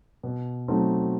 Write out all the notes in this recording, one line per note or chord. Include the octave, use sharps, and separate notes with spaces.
B2
F#3 A3 C4 D#4